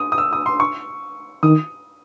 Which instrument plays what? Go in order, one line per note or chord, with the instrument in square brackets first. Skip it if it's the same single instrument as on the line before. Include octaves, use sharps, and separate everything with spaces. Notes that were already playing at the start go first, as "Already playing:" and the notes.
Already playing: [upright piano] D#6
D#6
E6
D#6
C6
C#6
[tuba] D#3 [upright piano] D#6